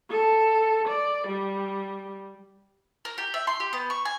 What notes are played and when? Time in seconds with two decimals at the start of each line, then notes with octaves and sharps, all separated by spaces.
0.10 A4
0.88 D5
1.27 G3
3.05 A#4
3.18 G4
3.34 E5
3.47 C6
3.60 G4
3.73 B3
3.90 C#6
4.05 G#5